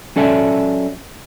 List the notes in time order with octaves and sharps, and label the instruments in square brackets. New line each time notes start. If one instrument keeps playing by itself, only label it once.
[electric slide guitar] F#3 C#4 A4 D5 E5 A5